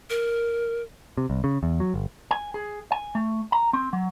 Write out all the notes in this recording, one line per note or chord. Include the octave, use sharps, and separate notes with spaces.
A#4
C3
C2
C#3
E2
F#3
G1
G#5
G#4
G#5
A3
A#5
C4
F#3